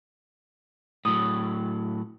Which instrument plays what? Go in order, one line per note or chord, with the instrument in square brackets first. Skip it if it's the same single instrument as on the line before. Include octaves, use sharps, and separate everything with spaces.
[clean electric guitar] A2 F#3 [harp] D#6